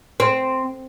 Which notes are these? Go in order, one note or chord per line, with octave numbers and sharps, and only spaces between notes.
C4